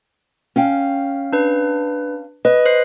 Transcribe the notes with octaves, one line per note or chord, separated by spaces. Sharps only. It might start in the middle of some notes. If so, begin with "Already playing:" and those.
C#4 F5 G5
D4 B4
B4 D#5
C5 F#6 C7